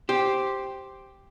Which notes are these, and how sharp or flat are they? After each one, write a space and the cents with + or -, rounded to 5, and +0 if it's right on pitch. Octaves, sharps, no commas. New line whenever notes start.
G4 +0 C5 +5